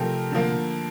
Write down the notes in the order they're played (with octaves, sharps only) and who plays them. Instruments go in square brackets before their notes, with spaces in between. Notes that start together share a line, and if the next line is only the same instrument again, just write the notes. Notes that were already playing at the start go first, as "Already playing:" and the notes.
Already playing: [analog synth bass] C3 [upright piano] F3 A3 C4 G4 A#4
[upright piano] D3 F3 A#3